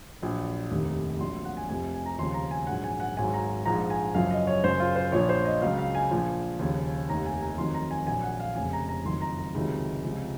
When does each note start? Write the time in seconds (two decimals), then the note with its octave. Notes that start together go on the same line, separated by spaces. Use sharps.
0.22 A#1 A#2 F#3
0.71 F1 D#2 D#3
1.20 A#1 A#2 F#3 C6
1.45 F#5
1.57 G#5
1.69 F1 F2 C3 G#5
1.94 G#5
2.06 A#5
2.18 D#2 C#3 F3 C6
2.34 A#5
2.51 G#5
2.67 A#1 G#2 F#3 F#5
2.84 G#5
3.00 F#5
3.16 G#1 G#2 F#3 G#5
3.33 A#5
3.65 A#1 G#2 F3 A#5
3.90 G#5
4.15 F#1 F#2 F3 F5
4.31 D#5
4.47 C#5
4.64 F#1 F#2 C#3 C5
4.80 F4
4.96 C5
5.12 A#1 A#2 F3 C#5
5.29 C5
5.45 D#5
5.62 C#2 C#3 F#3 F5
5.78 F5
5.95 G#5
6.11 A#1 A#2 F3
6.59 D#2 C#3 F3
7.09 F1 D#2 D#3 A#5
7.26 G#5
7.42 A#5
7.58 F2 D#3 F#3 C6
7.75 A#5
7.91 G#5
8.07 A#1 A#2 F#3 G#5
8.23 F#5
8.40 F5
8.55 F1 F2 C#3 F3 G#5
8.73 A#5
8.88 A#5
9.05 F#1 F2 D#3 F#3 C6
9.21 A#5
9.38 A#5
9.54 C#2 C3 D#3 F#3
10.03 C#2 C3 F3